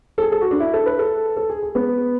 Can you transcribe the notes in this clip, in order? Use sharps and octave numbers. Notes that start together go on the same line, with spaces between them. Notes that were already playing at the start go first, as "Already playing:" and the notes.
A4
G#4
A4
F#4
D4
E4
A4
B4
A4
A4
G#4
G#4
B3